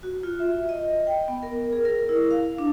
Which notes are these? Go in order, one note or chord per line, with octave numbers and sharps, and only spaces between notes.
F#4
F4
E5
D#5
G5
B3
A#4
G#4
A#4
E4
F5
D4